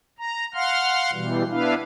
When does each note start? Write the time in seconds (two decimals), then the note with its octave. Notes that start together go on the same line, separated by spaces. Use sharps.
0.19 A#5
0.54 F5 F#5 C6 F6
1.13 B2 E3 G3
1.50 B3 D4 E4 B4 F5